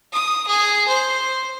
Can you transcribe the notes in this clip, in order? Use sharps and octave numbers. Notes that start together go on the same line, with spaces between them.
D#6
G#4
C5